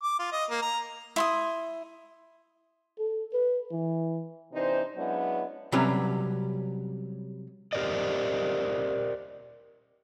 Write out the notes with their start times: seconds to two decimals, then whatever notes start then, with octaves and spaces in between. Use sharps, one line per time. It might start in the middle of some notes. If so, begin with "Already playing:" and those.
0.03 D6
0.19 F4
0.32 D#5
0.50 A#3
0.62 A#5
1.16 E4 C6 D#6
2.99 A4
3.33 B4
3.71 E3
4.52 C3 E3 D4 D#4 C5
4.95 F#3 G#3 B3 C#4 D4 E4
5.72 C3 F#3 G3 C#4 B4
7.73 G4 A#4 C5 D5 D#5